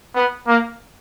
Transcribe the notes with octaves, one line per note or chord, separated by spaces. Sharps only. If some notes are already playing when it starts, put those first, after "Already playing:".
B3
A#3